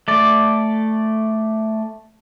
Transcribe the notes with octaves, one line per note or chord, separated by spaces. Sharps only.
A3 D5